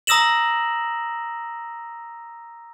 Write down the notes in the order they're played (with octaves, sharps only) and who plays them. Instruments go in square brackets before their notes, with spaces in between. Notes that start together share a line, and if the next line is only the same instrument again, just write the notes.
[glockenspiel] A#5 D#6 E6 A#6 E7 F#7